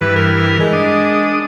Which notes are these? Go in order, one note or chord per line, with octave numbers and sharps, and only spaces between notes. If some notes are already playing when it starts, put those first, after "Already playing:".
G2 E3 B4
A#4
G#3
D4 D#6